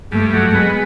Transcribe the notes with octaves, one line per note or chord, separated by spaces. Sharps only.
G2 A3
F#3
G#3 B3